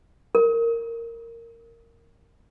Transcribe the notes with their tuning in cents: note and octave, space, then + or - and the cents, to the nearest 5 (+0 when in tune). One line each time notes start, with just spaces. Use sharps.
A#4 -15